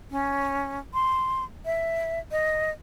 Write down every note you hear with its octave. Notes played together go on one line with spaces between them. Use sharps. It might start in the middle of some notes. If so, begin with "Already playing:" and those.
C#4
C6
E5
D#5